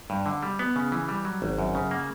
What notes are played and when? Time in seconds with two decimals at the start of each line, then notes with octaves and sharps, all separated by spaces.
0.10 G2
0.26 D3
0.43 G3
0.59 B3
0.76 C#3
0.92 E3
1.09 G3
1.25 F#3
1.42 G#1
1.59 F#2
1.75 C#3
1.91 A#3